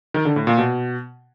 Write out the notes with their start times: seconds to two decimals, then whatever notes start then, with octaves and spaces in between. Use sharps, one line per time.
0.14 D#3
0.25 D3
0.36 A2
0.47 A#2
0.58 B2